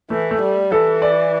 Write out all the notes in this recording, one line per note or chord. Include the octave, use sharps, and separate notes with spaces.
E3 A3
A3
G3
E3 A4
D5